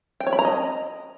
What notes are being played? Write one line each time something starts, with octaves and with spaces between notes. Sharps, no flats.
G5
C#5
B5
A#5
D#5